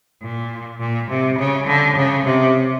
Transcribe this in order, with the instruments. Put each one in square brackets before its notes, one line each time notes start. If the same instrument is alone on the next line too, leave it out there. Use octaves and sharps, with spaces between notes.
[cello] A#2
A#2
C3
C#3
D3
C#3
C3